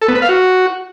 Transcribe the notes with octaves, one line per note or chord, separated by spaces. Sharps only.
A4
B3
B4
F5
F#4